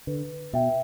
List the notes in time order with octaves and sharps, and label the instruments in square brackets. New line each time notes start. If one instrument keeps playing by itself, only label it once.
[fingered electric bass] D3 [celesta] B4
[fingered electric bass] B2 [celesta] E5 G5